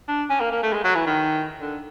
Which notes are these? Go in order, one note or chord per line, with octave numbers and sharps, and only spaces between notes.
D4
C#4
A#3
A#3
A3
G#3
F#3
E3
D#3
D3